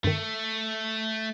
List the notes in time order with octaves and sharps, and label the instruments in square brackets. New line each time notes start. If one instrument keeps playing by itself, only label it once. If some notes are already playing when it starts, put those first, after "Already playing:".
[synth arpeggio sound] G2 D#3 [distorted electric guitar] A3